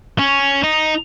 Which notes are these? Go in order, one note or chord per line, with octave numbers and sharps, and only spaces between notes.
C#4
D#4